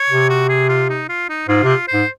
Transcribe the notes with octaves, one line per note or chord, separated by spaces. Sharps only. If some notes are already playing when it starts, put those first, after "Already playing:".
Already playing: C#5
C3
F#4
G#4
F4
D#4
F4
D#4
G#2 F4
C3
F4
C5
G#2